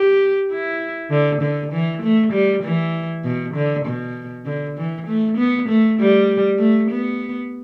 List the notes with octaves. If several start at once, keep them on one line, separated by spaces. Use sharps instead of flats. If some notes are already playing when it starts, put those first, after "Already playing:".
Already playing: G4
E4
D3
D3
E3
A3
G3
E3
B2
D3
B2
D3
E3
A3
B3
A3
G3
A3
B3